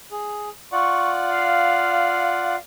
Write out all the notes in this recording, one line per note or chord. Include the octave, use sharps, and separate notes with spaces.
G#4
F4 D5 F#5 C#6
F5